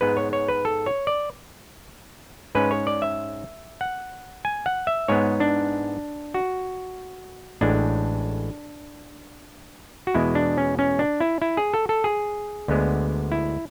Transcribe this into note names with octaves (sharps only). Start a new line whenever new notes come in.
G#2 G#3 B3 B4
C#5
C#5
B4
A4
C#5
D5
G#2 G#3 C#4 B4
C#5
D5
E5
F#5
G#5
F#5
E5
G#2 G#3 B3 C#5
D4
F#4
A1 A2 G#3 D4
F#4
E2 B2 G#3 E4
D4
C#4
C#4
D4
E4
E4
G#4
A4
A4
G#4
D2 D3 G#3 B3
E4